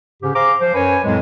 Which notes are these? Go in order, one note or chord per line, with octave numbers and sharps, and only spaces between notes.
G#2 C#3 C#4 G4
G#4 C5 F5 A#5 D6
F3 C5
F#2 B4 C#5 G#5
F2 A2 F#3 G#3